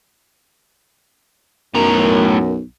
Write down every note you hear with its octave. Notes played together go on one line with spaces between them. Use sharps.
B1 F#2 A2 A#4 A#5